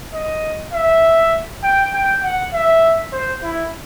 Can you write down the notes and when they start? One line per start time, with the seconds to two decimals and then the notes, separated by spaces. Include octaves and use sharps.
0.14 D#5
0.73 E5
1.63 G5
1.94 G5
2.23 F#5
2.53 E5
3.13 C5
3.43 E4